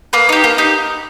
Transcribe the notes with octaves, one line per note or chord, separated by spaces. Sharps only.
A#3 B4
D#4 G4
A#3
D#4 G4